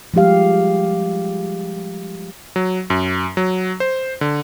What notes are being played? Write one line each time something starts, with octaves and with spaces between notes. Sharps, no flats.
F3 G3 G#3 G4 F5
F#3
F#2
F#3
C5
D3